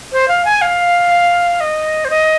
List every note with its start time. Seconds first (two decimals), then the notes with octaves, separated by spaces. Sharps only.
0.12 C5
0.28 F5
0.45 G#5
0.62 F5
1.60 D#5
2.05 C5
2.10 D#5